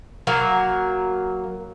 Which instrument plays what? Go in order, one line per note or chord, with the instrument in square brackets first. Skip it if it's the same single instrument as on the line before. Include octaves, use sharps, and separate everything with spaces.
[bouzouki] F#3 A#3 F5 A#5